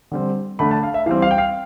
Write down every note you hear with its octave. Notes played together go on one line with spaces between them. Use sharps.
D3 G3 C4
D3 A3 D4 B5
A5
F5
E5
E3 G3 C4 F5
F5
G5
F5